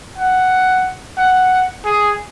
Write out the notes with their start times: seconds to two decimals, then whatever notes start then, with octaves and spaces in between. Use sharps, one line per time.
0.18 F#5
1.18 F#5
1.85 G#4